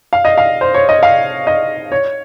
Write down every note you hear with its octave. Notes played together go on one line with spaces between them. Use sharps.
F5
D#5
F5
C5
C#5
D#5
F5
D#5
C#5